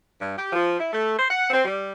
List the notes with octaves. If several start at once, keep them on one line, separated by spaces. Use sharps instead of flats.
G2
G4
F3
E4
A3
C5
F#5
C4
G3